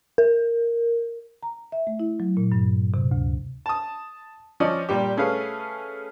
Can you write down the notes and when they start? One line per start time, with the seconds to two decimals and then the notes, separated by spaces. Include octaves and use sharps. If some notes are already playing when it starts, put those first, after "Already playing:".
0.18 A#4
1.43 A#5
1.72 E5
1.87 A3
2.00 E4
2.20 F#3
2.37 A#2
2.52 G2
2.94 C3
3.11 D2
3.66 A5 D#6
4.60 F3 C#4 D5 D#5
4.89 A#2 G3 G4
5.17 A3 C#4 G#4 B4 F5